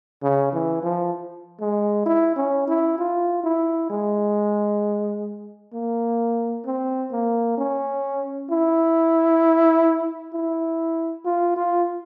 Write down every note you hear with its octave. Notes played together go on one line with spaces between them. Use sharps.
C#3
E3
F3
G#3
E4
C#4
E4
F4
E4
G#3
A#3
C4
A#3
C#4
E4
E4
F4
F4